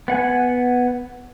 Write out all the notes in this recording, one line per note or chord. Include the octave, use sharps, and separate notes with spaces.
B3 F#5 G#5